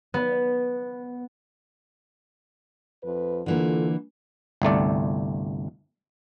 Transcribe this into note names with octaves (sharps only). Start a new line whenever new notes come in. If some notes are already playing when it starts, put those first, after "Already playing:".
B3
F2 F3 B4
D3 E3 A#3 F4 A4
G1 C2 A3 D5